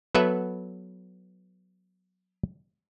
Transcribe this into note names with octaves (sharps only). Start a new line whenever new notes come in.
F#3 B3 A4 B4 E5 F#5